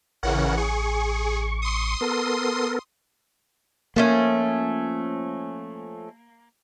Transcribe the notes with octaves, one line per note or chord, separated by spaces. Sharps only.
A1 C#3 E3 A#4 C#5 F#5
G#4 C#6
C6 D#6
B3 A4 A#4
F3 A3 A#3 C#4